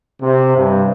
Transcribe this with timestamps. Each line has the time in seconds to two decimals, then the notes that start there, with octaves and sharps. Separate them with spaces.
0.21 C3
0.56 G2